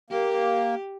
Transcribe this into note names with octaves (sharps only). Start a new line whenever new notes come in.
A#3 G4